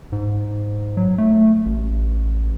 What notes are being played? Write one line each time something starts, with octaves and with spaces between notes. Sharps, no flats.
G#2
F#3
A3
A1